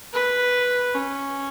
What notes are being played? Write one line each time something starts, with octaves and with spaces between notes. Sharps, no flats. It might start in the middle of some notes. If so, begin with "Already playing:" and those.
B4
C#4